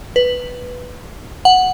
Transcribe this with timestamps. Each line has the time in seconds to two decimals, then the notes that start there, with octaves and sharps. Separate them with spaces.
0.16 B4
1.45 F#5